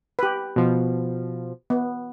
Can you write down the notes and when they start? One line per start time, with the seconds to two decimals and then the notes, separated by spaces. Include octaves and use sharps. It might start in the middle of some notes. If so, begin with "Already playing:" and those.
0.19 G4 B4
0.56 B2 F3
1.70 B3